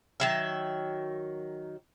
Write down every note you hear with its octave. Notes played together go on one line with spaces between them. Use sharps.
D#3 F#3 E5